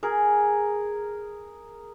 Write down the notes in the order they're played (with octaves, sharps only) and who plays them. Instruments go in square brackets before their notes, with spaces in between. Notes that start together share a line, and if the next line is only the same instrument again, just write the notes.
[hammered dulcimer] G#4 A#4